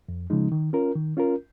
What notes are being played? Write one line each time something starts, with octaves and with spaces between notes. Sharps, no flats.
F2
C#3 F3 G#3 D#4
D#3
C#4 F4 A#4
D#3
C#4 F4 A#4